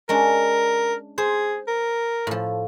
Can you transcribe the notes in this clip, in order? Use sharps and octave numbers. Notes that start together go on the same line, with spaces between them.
G#3 C#4 D4 A#4
G#4 C5
A#4
A2 F3